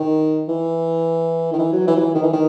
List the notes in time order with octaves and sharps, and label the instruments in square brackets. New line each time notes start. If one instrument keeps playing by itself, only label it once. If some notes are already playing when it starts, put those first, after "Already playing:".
Already playing: [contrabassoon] D#3
E3
D#3
E3
F#3
E3
F#3
E3
D#3
E3
D#3